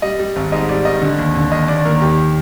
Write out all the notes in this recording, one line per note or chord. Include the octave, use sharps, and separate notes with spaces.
G3 D#5
G3
G#1
G#2 D#5
G3 D5
D#3 D#5
D3
D#2
D3
D#2 D#5
D#2 D5
D#2 A#4
D#3 G4